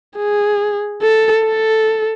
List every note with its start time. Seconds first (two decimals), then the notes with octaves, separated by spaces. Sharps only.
0.17 G#4
1.02 A4
1.45 A4